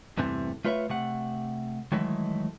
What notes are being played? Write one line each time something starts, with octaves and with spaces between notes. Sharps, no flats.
E2 G2 C3 E3 A3 C4
A3 F4 B4 C#5 D#5 E5
C3 A3 F#5
D#3 E3 F#3 G#3 A3 E4